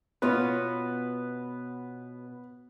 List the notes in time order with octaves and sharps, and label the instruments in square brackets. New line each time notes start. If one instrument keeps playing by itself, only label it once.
[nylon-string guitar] B2 C#4 F4 [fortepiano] B3